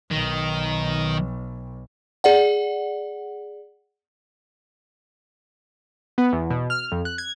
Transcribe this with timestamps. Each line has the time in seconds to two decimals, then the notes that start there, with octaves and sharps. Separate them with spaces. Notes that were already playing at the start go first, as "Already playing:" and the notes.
0.11 B1 D#3
2.24 G#4 D5 F#5
6.18 B3
6.32 E2
6.50 B2
6.70 F6
6.92 F2
7.05 F#6
7.18 G#6